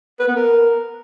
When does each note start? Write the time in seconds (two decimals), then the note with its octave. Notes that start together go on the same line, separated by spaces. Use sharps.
0.20 B4
0.28 B3
0.36 A#4